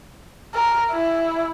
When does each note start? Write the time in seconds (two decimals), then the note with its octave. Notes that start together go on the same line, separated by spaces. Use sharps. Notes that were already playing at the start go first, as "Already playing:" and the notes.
0.54 A#4
0.91 E4